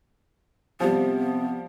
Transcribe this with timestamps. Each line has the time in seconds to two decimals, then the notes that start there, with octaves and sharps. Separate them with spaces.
0.80 C3 F3 G3 B3